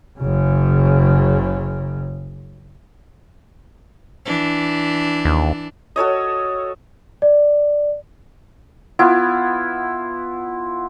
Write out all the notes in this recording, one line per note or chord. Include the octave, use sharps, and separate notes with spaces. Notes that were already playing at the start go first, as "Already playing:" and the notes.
F#1 C#3
E3 D4
D#2
F#4 A4 C#5 D#5
D5
B3 E4 F4